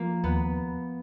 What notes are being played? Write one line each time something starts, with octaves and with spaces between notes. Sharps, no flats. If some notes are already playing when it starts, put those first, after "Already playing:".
Already playing: F3 A#3
D#2 B3